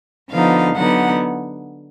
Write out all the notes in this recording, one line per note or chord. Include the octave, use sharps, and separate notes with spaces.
D3 F3 B3 D#4 F5
D3 F#3 B3 D#4 F#5